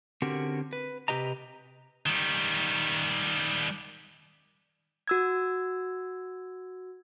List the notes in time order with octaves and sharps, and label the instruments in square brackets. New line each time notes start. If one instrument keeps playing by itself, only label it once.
[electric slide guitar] D3 C4 C#4 F#4 G4 A#4
B4
C3 F#3 G4 B4 D#5 A#5
[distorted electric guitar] D#3 G3
[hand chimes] F#4 E6 G#6